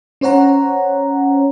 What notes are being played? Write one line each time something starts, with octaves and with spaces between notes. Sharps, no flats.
C#4 C5 C#5 F#5 A#5